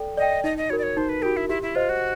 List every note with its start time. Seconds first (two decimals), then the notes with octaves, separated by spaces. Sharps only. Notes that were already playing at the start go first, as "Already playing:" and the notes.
Already playing: A4 D5 G5
0.17 D5 D#5 G5
0.44 D#4 D#5
0.57 D#5
0.70 F#4 A#4 C#5
0.78 D5
0.83 C#5
0.97 D#4 C5
1.09 B4
1.22 F#4 G4 A#4
1.37 E4
1.49 E4 G4
1.62 E4
1.75 F4 C5 D#5
1.89 F#4